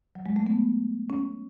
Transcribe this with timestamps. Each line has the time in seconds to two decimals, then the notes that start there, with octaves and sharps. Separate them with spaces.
0.15 F#3
0.26 G#3
0.36 A3
0.47 B3
1.10 C#4